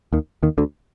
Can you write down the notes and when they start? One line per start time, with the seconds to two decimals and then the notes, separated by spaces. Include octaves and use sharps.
0.13 D#2 D#3
0.43 D#2 D#3
0.58 D2 D3